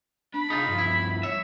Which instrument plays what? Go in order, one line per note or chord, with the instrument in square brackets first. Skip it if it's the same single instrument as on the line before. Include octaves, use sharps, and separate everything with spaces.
[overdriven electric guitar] D4 [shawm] B5
[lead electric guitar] D#4 F4 [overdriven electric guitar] G#4 F5
[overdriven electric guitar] G2 F3
[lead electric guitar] E4
[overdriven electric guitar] C#5 [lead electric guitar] E5